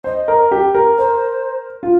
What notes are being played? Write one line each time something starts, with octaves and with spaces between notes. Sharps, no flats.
C5 D#5
A#4
G4
A#4
A#4 C5
F4